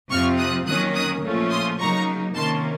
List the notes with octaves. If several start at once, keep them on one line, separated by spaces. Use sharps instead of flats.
F2 C3 F3 C4 F4 C#6 F6
D#6 F#6
D#3 F#3 A#3 C#4 D#6 F#6
D#6 F#6
A#2 F3 A3 C#4 F4
C6 D#6
C#3 F#3 A#3 D#4 A#5 C#6
C3 D#3 A#3 C#4 A5 C6